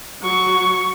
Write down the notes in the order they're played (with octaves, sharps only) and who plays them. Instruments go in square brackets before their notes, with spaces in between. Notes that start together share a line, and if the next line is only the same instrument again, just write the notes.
[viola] F#3 C#6